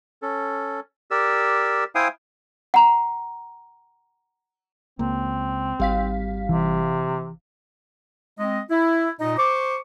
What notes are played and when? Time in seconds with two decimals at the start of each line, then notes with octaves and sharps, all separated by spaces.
0.22 C#4 A4
1.11 G4 A#4 D5 E6
1.95 E4 C5 F5 G5 G#5 D#6
2.74 F#5 A#5
4.99 C#2 A#3 C4
5.80 G#1 G3 F5 B6
6.49 C3 E3
8.39 G#3 C4 D#5
8.70 E4
9.20 A#2 D#4 D#5
9.38 C5 C#6 D6